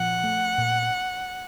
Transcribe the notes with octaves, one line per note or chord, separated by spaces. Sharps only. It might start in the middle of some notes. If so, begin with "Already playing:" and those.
Already playing: A#2 F3 F#5
A3
A#2